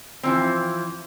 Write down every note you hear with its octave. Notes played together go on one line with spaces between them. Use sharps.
E3 F3 C4